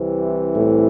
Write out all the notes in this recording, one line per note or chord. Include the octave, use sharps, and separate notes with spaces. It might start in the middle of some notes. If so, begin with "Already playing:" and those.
Already playing: C2 C3 E3
A2